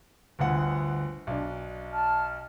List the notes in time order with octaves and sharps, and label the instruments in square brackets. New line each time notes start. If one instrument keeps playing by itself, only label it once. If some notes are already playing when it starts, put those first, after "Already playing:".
[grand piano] G1 D2 F#5
B1 D4
[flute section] A5 F6